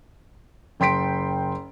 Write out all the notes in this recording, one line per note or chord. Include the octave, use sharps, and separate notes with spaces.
F#1 G5 C6 B6 D7